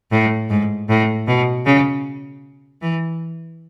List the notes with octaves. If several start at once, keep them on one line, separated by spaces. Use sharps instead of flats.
A2
G#2
A2
B2
C#3
E3